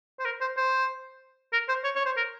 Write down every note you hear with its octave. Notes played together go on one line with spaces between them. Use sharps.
C5
A#4
C5
C5
A#4
C5
C#5
C#5
C5
A#4